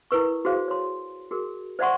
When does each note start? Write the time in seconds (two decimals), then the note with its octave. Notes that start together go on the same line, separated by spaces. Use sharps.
0.11 E4 A#4 B4 C#6
0.45 F#4 G#4 C5 F5
0.68 C#5 C6
1.31 F#4 G#4 A#4
1.79 C5 D5 E5 F#5 C6 C#6